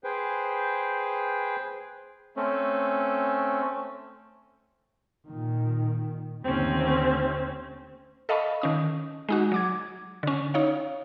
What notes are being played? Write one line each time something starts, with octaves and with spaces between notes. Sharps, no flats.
G#4 B4 C5 G5
A3 C4 C#4
A#2 D#3
D#2 D3 A3 C4 C#4
A4 D#5 F5 A5 B5 C#6
D#3 C#4 D#6
G#3 D#4 F#4
F#3 D6 G#6
D3 C#4
D#4 C#5 F5